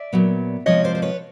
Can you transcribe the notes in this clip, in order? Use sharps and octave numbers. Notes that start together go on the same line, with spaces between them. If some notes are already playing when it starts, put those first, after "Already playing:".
Already playing: D5 E5
A#2 F#3 B3
C3 F3 G#3 C4 C#5 D#5
C5 D5
C5
B4 C#5